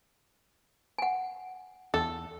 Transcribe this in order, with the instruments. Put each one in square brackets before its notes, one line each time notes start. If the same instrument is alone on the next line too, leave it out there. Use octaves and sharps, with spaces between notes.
[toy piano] F#5 G#5
[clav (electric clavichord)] E2 A5 [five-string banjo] A4